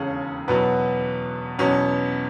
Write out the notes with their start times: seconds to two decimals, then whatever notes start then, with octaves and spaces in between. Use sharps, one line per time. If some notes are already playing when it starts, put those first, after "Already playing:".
Already playing: E1 D#2 C#3 C#4 G#4 A4
0.48 E2 B2 F#3 B3
1.59 E2 B2 F#3 C#4